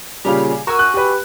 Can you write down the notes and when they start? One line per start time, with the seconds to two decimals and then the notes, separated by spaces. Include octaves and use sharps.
0.25 A#2 C#3 G3 G4 G#4 F5
0.67 F#4 A#4 G#5 E6
0.79 F#6
0.94 G4 B4